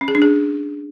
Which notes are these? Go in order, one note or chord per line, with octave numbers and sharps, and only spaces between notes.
C#4
G#4
D4
G#4